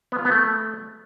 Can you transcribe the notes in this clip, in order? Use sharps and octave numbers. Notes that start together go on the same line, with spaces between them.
B3
F4
B3
A3